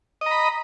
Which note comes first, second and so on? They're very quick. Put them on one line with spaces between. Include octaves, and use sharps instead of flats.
D#5 A#5 B5